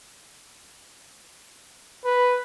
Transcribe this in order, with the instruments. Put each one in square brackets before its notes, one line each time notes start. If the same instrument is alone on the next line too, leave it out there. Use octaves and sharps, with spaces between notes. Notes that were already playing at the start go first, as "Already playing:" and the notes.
[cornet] B4